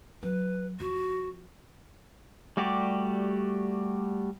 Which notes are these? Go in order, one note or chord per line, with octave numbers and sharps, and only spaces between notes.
F#3 B4
F2 F#4
G3 A3 F#4 G4 D5